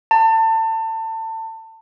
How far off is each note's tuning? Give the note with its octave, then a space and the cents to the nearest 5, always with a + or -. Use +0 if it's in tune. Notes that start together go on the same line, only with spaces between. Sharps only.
A5 +30